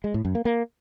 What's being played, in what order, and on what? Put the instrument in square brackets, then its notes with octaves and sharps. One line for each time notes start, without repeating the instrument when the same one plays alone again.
[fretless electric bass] G#3
A2
F#2
A#3
A#3